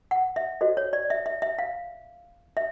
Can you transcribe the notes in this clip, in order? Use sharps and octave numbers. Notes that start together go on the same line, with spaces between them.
F#5
E5
F#4 A4 C5 D#5
C#5
D5
E5
E5
E5
F5
E5